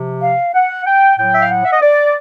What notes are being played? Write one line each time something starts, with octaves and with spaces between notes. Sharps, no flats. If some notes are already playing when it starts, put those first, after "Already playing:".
Already playing: C3 F3
F5
F#5
G5
A2 F#3 G5
E5
F5
F#5
E5
D#5
D5